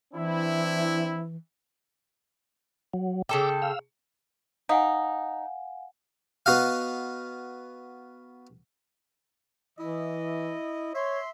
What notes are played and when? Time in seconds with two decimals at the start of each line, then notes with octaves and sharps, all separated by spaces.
0.14 E3 C4 D4 E4
2.94 F#3
3.29 C#3 A4 G5 D6 E6
3.62 F5 E6
4.69 D#4 F5 F#5 G#5
6.46 B3 F#4 D#5 F5
9.79 E3 E4 D#5
10.95 C#5 E5 C6